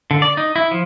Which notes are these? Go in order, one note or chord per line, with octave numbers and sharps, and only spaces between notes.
D3
D5
D#4
E4
F3